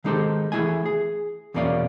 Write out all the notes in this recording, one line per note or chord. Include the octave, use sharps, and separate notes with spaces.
D#3 G#3 D#4 G4 A4 C5
E3 F#3 A3 E4 G#4 G#5
G#4
E2 B2 A#3 C#4 D5 F5